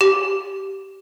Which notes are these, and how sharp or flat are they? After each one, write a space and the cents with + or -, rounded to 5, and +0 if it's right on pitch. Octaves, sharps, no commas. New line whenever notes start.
G4 -15